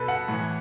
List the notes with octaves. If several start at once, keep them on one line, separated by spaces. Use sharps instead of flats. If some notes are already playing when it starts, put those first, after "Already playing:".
Already playing: B2 A4 B4
F#5
A2 E3